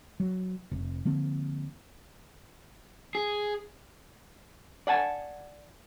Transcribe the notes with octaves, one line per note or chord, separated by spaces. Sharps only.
F#3
F1
D3 F3 A#3 C4
G#4
D5 F#5 G#5 A5